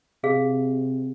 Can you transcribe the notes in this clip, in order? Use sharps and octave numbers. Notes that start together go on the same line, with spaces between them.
C3 G#4 F5